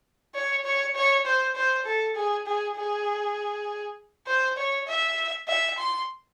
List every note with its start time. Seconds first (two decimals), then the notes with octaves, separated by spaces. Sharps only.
0.35 C#5
0.65 C#5
0.95 C#5
1.25 C5
1.56 C5
1.86 A4
2.16 G#4
2.46 G#4
2.76 G#4
4.27 C5
4.57 C#5
4.87 E5
5.48 E5
5.78 C6